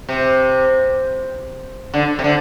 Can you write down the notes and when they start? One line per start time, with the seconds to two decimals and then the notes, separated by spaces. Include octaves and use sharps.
0.09 C3
1.94 D3
2.19 C3
2.24 D3